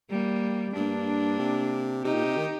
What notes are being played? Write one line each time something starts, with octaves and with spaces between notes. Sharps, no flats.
G3 A#3
G2 A#3 D4
C3
C3 D#4 G4
A#2
C3
D#3